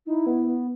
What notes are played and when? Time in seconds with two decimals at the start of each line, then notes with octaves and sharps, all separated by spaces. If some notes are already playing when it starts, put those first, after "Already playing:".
0.07 D#4 E4
0.26 B3
0.46 B3